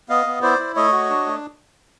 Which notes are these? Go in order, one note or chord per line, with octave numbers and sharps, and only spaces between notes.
B3 D#5 F5
B3
E4 C5 D5
E4
A3 C#5 D#5
F#4
D4
A3